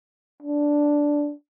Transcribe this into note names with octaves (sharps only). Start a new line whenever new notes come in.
D4